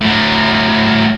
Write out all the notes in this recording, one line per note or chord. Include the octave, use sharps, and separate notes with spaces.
A2 F#3